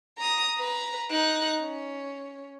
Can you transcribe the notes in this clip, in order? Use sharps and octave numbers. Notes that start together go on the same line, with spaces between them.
A#5 D#6
B4 A#5
D#4 F#6
C#4